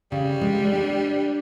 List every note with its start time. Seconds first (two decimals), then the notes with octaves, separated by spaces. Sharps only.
0.12 C#3 G3
0.41 G#3
0.73 D4